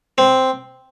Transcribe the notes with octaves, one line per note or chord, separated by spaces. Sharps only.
C4